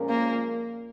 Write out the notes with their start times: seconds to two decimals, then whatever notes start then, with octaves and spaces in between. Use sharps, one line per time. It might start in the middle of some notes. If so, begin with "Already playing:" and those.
Already playing: A#2 F3 G#3 C#4 A#4
0.10 A#3